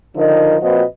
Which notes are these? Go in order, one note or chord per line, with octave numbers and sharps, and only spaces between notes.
D3 F3 D#4 A#4 D#5
A#2 F3 C4 F#4 B4 D#5